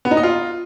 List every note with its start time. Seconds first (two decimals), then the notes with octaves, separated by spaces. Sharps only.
0.05 B3
0.11 D#4
0.17 D#5
0.23 F4